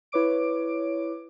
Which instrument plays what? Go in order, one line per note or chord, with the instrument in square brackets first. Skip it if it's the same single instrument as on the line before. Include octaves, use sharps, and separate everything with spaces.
[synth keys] E4 B4 C#5 D6 D7